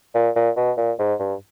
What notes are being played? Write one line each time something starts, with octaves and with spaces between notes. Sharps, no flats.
A#2
A#2
B2
A#2
G#2
G2